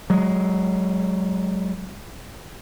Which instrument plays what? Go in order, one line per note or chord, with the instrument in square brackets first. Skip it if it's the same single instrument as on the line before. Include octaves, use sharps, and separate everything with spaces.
[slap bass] F#3 G#3